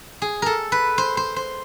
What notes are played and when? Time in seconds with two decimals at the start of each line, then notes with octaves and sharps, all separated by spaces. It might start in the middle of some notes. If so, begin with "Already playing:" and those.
0.22 G#4
0.42 A4 A#4
0.72 B4
0.98 C5
1.17 C5
1.36 C5